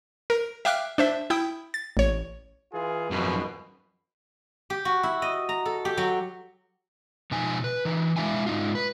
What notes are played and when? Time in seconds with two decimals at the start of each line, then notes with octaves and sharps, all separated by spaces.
0.30 A#4
0.65 E5 F5 G5 D6 F6 F#6
0.98 D4 C5 E5
1.30 E4 G5 D#6
1.74 A6
1.97 A1 C#5
2.72 E3 F4 G#4
3.11 G#1 F#2 B2 F3 B4
4.70 G4
4.85 F#4
5.03 E4
5.22 D#5
5.49 A#5
5.65 A4
5.85 G4
5.97 F#3
7.31 B2 F3 D#4 G#5
7.64 B4
7.85 E3 D#4
8.17 G#3 D4 E4 E5 F5 G#5
8.46 G#2 D#4 F4
8.75 B4